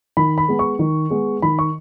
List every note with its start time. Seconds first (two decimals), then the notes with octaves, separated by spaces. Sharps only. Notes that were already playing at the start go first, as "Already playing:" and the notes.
0.17 D#3 B5
0.38 B5
0.48 G#3 B3
0.59 C#6
0.79 D#3
1.10 G#3 B3
1.42 D#3 B5
1.59 C#6